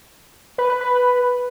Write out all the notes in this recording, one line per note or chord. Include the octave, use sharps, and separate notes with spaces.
B4
B4
B4